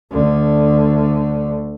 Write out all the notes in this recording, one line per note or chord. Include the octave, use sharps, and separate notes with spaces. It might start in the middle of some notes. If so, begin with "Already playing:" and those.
D2 D3